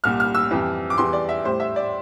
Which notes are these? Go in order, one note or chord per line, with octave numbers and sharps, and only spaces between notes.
C2 A#2 G3 F6
F6
E6
F2 E3 G3
D6
E2 E3 G3 C6
D5
E5
A2 G3 C5
E5
D5